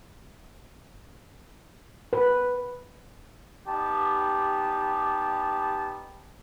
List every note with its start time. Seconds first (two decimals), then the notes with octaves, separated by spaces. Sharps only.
2.13 B4
3.68 G3 B3 D#4 G4 A5